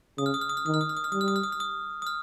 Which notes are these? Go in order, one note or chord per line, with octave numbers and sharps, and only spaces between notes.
C#3 D#6
F6
D#6
F6
D#6
F6
D#3 D#6
F6
D#6
F6
D#6
F6
G3 D#6
F6
D#6
F6
D#6
F6
D#6
D#6
F6